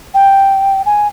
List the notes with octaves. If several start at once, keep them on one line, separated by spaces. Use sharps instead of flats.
G5
G#5